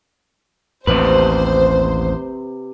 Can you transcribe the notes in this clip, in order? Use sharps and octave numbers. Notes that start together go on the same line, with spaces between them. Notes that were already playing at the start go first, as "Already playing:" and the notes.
A1 D#2 C3 B4 C5